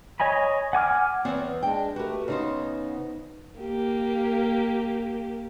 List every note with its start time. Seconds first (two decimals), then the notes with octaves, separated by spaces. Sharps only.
0.20 C#5 D#5 G#5 B5
0.73 F#5 G#5 D6 F6
1.25 E2 B3 C4 C#5
1.63 G#3 D4 G5
1.96 A3 F#4 G4 A#4 B4
2.28 C#3 B3 D#4 C5
3.61 A#3 G4